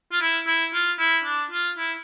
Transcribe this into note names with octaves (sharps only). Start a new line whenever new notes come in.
F4
E4
E4
F4
E4
D4
F4
E4